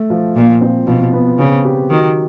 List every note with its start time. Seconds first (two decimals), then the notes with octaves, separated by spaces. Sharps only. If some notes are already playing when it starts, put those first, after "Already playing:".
Already playing: A3
0.10 F3
0.36 A#2 F3
0.61 C4
0.87 B2 F3
1.13 B3
1.39 C#3 C4
1.64 G4
1.90 D#3 F#3